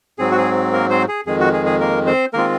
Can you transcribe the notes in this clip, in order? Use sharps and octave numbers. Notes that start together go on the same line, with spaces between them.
G#2 F#3 C4 G#4
F#4
G#4
A#3 A#4
C4 C5
G#4
F2 D#3 G#3 G#4
F#4
G#4
G#4
A#3 A#4
C4 C5
D#3 G#3 A#3 C4 F4 A#4